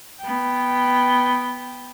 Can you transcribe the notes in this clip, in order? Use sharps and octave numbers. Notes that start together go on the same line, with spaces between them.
B3 G5